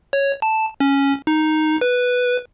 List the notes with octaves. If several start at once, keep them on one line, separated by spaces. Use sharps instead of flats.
C#5
A5
C#4
D#4
B4